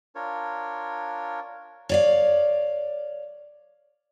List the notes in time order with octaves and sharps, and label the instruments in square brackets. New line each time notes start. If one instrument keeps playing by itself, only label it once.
[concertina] D4 F4 A#4 C#5
[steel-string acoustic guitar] C#5 D5 F5